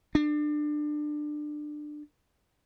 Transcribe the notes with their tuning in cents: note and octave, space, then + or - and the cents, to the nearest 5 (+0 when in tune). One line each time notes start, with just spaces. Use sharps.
D4 +25